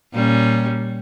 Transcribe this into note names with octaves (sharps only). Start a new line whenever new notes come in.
A#2 G3 C#4